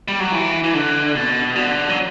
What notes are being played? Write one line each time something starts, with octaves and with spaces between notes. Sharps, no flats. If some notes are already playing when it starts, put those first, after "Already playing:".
G3
F#3
E3
E3
D3
B2
D3
F#3